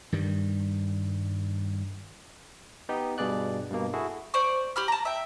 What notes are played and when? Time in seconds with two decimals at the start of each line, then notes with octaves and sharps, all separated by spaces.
0.12 G2 D#3 G3
2.89 B3 D#4 G4
3.18 G2 B2 G#4 D5 F#6
3.70 G2 B2 A#3
3.94 E4 F#4 G#4 A4
4.34 C5 D5 C#6
4.76 G4 B5 F6
4.88 A5 A#5
5.05 E5 G5